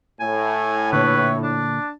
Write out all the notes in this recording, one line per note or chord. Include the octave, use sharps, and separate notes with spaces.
A2 G#5
A#2 D3 B4 C#5
D4 A5